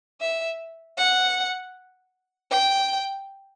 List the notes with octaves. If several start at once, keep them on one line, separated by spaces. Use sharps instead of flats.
E5
F#5
G5